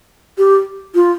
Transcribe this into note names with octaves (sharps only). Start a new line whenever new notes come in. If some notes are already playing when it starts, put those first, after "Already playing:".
G4
F4